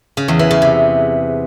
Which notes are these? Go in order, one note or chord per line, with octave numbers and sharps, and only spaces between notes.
C#3
E2
E3
C#3
C3